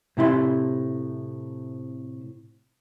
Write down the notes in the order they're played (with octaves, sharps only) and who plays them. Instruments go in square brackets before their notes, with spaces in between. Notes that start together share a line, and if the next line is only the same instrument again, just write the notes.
[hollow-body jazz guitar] A2 C3 E4 F5 C6